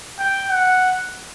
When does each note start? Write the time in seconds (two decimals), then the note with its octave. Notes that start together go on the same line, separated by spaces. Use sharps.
0.19 G5
0.50 F#5